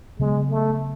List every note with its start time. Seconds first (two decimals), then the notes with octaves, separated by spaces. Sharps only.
0.19 C#3 F#3 G#3 B3
0.50 A3